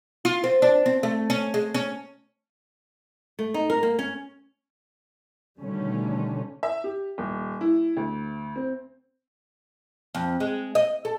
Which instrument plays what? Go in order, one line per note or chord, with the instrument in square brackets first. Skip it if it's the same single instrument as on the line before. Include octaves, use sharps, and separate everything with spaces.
[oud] F4
C4
D4
C4
A3
C#4
G#3
C#4
[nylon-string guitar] A3
D#4
A#4
A#3
C#4
[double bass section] B2 D3 D#3 G3 A3 C#4
[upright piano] E5
G4
D#1
E4
D2
C4
[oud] F2
G#3
D#5
A4